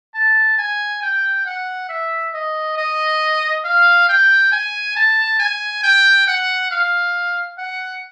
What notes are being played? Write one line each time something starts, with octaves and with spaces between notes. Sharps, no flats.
A5
G#5
G5
F#5
E5
D#5
D#5
F5
G5
G#5
A5
G#5
G5
F#5
F5
F#5